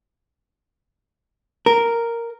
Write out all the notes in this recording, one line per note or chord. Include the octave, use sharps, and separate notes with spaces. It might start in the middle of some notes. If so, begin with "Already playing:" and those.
A#4